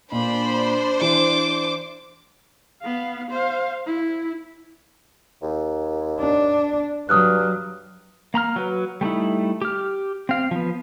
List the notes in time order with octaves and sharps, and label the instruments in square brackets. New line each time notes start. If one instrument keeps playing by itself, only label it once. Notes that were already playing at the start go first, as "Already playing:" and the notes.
[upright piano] A#2 [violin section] D4 C5 [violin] B5
[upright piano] E3 E4 [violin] D6
[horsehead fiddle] B3 F5
C5 F5
E4
[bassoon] D#2
[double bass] D4
[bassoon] G2 [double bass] F#3 [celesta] D#6 F6 F#6
[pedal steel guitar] A#3 A#5 B5 F6
F#3 B4
G3 A3 D#4 E4
G4 F6
C4 F5
F3 B3